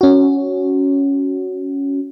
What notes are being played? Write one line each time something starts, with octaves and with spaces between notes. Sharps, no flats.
C#4 F#4